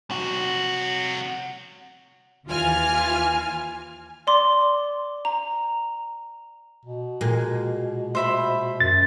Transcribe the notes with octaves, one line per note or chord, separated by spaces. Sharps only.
C3 F#4
D#2 E3 F4 G#5 F6
D5 C6 D6
A#5
B2
A#2 G#3
C5 E5 B5
F#2 A6